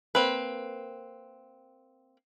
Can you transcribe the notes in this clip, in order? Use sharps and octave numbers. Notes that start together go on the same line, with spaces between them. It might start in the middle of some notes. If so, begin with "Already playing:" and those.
A#3 C4 B4